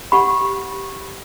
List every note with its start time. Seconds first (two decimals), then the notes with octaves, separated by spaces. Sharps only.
0.12 G4 F#5 B5